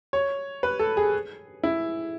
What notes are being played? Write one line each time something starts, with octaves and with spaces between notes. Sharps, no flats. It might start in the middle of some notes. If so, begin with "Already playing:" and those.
C#5
B4
A4
G#4
E4